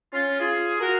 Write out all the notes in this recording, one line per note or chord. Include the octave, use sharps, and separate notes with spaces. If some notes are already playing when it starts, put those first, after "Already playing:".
C#4 F4
F4 G#4
F#4 A#4